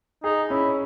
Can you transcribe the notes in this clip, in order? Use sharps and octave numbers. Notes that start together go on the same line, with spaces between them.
D#4 G#4
C#4 E4